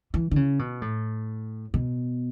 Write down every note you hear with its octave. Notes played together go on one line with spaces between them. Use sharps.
E3
D3
C#3
B2
A2
B2